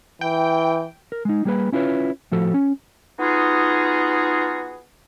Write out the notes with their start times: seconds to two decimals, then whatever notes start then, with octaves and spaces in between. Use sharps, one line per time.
0.21 E3 G5
1.12 A#4
1.25 G#3 D#4
1.45 G3 A#3 G4 G#4 B4 B5
1.72 C#4 E4 F4 B4 C#5
2.32 A2 F3 F#4 A4
2.54 C#4
3.19 B3 D#4 F4 F#4 G#4